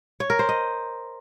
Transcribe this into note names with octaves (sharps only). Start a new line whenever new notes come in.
C#5
A#4
C5
D#5